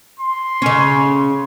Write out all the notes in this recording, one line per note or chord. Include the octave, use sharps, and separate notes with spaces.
C6
C#3 C#4